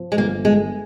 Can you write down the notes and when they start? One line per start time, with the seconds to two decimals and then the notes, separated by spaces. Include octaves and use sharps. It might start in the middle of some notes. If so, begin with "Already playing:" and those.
Already playing: F3
0.12 G#3
0.18 G1 A#3
0.44 G1 G#3